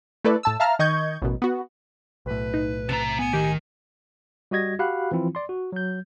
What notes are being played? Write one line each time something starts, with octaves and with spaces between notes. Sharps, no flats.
A3 E4 A4 B4 D5
A2 A5 E6
E5 F5 A5 A#5 F6
D#3 D#5 C#6 G6 G#6
A1 F#2 B2
B3 F#4
B1 A2 B4
D#4
C3 A5 A#5
B3 G#5
D#3 G4
G3 F#4 D#5 G#6 A#6
F#4 G4 F5 F#5 B5 F#6
E3 F3 C4 E4 F4
D5 C6
F#4
F#3 G6